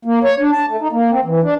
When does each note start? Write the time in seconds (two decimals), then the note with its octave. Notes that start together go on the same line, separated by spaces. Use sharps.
0.05 A#3
0.24 C#5
0.40 D4
0.52 A5
0.68 A3
0.81 D#4
0.92 A#3
1.11 C4
1.25 E3
1.43 D4